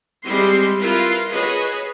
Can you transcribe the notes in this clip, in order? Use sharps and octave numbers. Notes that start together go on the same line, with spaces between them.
G3 G#3 C4 E4 C6
E4 F4 A#4 B4 F5
F#4 G#4 B4 C#5 D#5